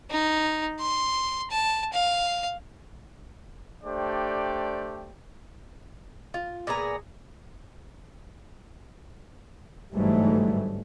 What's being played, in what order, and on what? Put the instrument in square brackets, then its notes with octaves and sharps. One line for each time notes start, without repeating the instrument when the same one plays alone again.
[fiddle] D#4
C6
A5
F5
[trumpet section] A3 D4 G4 C5 D5 G5
[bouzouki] F4
A#2 B3 G#4 A#5
[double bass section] G1 G#2 E3 F#3 G3 A3